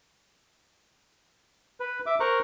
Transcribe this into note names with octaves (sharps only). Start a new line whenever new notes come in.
B4
E5 D6
A#4 C5 A#5 C#6 F#6